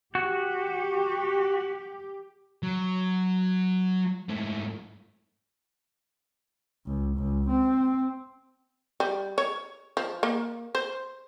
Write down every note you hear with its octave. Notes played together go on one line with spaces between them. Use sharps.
F#4 G4
F#3
G#2 A3
C#2
C#2
C4
G3
C#5
F3
A#3
C5